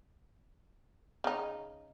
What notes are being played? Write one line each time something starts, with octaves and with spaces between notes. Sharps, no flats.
C#3 D#4